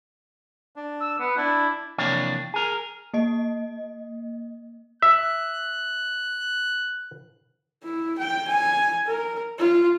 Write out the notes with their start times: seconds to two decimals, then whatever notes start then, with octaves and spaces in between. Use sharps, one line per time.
0.76 D4
1.01 E6
1.20 B3
1.37 D4 E4
1.98 F2 C3 E3 A#3 D4 C#5
2.54 G#4 A#4
3.14 A#3 D#5
5.02 E5 F#6
7.83 E4
8.18 G5
8.48 G#5
9.06 A#4
9.58 F4